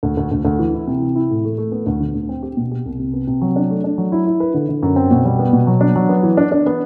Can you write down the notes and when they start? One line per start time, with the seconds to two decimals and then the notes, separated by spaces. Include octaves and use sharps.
0.03 D2
0.17 D2
0.31 D2
0.45 D2
0.59 E3
0.74 E4
0.87 C3
1.02 E3
1.15 E4
1.30 A2
1.44 A3
1.58 A3
1.72 B3
1.86 D2
2.00 D3
2.15 D2
2.29 C4
2.43 G4
2.57 B2
2.71 G4
2.86 C2
3.00 C3
3.13 B3
3.28 C3
3.41 F#3
3.56 D4
3.70 A3
3.84 D4
3.98 F#3
4.12 E4
4.26 E4
4.40 B4
4.54 D3
4.69 D3
4.83 F#2
4.96 C4
5.11 B2
5.25 G3
5.39 B3
5.53 B2
5.67 F#3
5.81 D4
5.96 F#3
6.09 B3
6.23 E3
6.37 D4
6.52 D4
6.66 B3